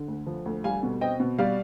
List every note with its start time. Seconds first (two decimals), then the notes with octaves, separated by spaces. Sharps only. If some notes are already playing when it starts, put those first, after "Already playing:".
Already playing: D3
0.08 D2
0.26 F3
0.46 D2
0.64 G3 F5 G#5
0.83 B2
1.01 C4 D#5 G5
1.20 B2
1.39 G3 D5 F5